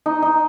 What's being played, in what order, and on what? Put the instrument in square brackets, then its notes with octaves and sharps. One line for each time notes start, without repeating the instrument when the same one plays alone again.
[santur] D#4
D#4